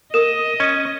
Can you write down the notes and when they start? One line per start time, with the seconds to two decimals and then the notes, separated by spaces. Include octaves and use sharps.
0.14 A#4 D#5 D#6 E7
0.60 C#4